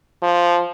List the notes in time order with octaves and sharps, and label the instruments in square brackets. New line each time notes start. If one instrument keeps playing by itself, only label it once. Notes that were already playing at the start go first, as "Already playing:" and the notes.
[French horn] F3